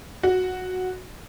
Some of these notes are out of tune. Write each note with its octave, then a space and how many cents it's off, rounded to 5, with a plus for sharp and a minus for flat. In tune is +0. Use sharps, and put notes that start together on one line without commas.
F#4 -5